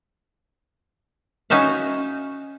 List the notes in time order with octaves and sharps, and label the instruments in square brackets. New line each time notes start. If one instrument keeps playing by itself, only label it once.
[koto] C#4 D#4 F#4 E5 F5